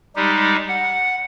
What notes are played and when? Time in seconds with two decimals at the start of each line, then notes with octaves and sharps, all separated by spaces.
0.16 G3 G#3 D#4 G4
0.68 F#5